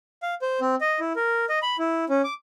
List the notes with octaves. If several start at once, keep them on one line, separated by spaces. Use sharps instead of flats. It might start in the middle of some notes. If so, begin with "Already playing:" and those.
F5
C5
C4
D#5
E4
A#4
D#5
B5
E4
C#4
D6